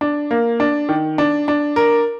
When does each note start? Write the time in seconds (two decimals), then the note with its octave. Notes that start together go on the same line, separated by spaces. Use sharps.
0.01 D4
0.31 A#3
0.60 D4
0.89 D#3
1.18 D4
1.48 D4
1.76 A#4